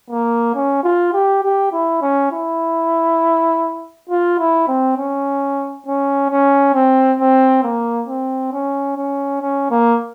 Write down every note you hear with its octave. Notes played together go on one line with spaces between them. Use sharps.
A#3
C#4
F4
G4
G4
E4
C#4
E4
F4
E4
C4
C#4
C#4
C#4
C4
C4
A#3
C4
C#4
C#4
C#4
A#3